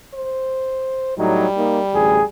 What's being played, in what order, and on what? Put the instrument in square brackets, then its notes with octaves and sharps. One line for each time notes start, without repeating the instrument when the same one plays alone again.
[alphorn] C5
[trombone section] A2 F#3 D#4 [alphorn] G3
[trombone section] A#3 D#4
A1 D2 G#4